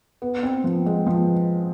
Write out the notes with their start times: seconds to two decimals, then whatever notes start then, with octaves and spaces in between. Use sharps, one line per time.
0.22 B3
0.43 C4
0.64 F3
0.86 G#3
1.06 F3